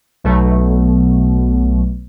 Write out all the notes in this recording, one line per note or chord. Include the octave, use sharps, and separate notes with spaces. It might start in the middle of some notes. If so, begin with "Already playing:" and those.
B1 B2 F#3 A3